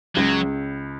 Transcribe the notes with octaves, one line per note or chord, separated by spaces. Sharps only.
C#2 C#3 F#3